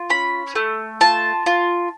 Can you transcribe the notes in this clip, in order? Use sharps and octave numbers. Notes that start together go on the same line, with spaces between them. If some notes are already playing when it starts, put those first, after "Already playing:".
Already playing: F4
C#4 B5
A3
F4 A5
F4